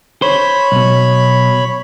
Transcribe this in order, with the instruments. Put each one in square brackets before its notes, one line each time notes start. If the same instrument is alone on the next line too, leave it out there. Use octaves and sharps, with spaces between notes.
[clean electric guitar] C5 [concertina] C#5 B5
[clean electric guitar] B1 B2